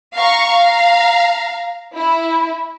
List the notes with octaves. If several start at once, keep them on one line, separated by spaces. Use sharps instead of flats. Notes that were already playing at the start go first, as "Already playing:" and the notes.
F5 A#5 C#6
F5 A#5
E4